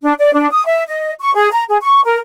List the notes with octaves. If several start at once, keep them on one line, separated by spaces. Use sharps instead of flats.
D4
D5
D4
D#6
E5
D#5
C#6
G#4
A#5
G#4
C#6
A#4